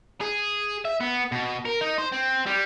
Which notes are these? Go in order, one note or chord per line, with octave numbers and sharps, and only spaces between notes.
G#4
E5
B3
B2
A#4
D#4
C5
C4
G3